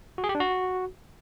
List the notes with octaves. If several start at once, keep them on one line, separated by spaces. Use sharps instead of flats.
F#4
G#4
G4
D4
F#4